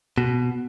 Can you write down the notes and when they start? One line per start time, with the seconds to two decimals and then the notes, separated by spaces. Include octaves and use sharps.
0.18 B2